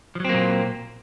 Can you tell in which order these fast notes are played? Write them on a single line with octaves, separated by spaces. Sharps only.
F3 F#3 C4 A#3 A#2